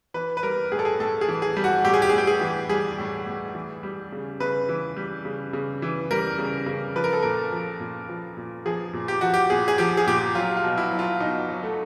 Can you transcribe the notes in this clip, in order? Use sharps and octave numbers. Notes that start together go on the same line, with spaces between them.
E3 B4
B4
G3 A#4
A2 G#4
A4
G#4
A2 A4
G#4
E3
G#4
G3
F#4
A2 G4
G#4
G4
G#4
A2 G4
G#4
E3
G3 G#4
A2
A2
E3
G3
C#3
C#3 B4
E3
G3
C#3
C#3
E3
G3 A#4
C#3
C#3
F3 B4
A#4
A4
A#2 A#4
F3
A#2
F3
A#2
F3 G#4
A#2
G4
F3 F#4
G4
A#2 G#4
G#4
F3 G4
G#4
A#2 G4
F#3 F4
F4
B2
E4
F#3
F4
B2 D#4
F#3
A3